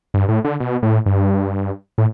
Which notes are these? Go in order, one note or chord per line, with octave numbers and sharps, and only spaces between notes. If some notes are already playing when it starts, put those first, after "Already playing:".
G2
A2
D3
B2
A2
G2
A2